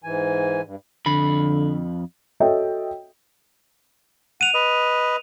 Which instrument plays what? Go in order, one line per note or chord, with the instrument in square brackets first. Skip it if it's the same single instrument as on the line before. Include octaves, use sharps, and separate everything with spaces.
[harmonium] G#2 E3 G#5
G2
[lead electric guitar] F2 B5 [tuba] D3
[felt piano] F#4 A4 C#5 D#5 E5 G5
[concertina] F#5 [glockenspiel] D#7 F7
[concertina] B4 D#5